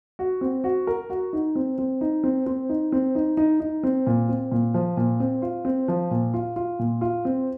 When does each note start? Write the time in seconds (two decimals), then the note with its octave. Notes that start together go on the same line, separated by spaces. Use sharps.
0.19 F#4
0.41 C4
0.64 F#4
0.87 A#4
1.10 F#4
1.33 D#4
1.55 C4
1.78 C4
2.01 D#4
2.24 C4
2.46 C4
2.69 D#4
2.92 C4
3.15 D#4
3.37 D#4
3.60 D#4
3.83 C4
4.07 A#2
4.29 C4
4.52 A#2
4.74 F3
4.97 A#2
5.20 C4
5.42 F4
5.65 C4
5.88 F3
6.11 A#2
6.34 F4
6.56 F4
6.79 A#2
7.01 F4
7.25 C4